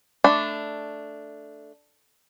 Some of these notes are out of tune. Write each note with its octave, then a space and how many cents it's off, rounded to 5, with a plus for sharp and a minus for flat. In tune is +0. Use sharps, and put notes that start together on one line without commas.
A3 +0 D4 +0 B5 +35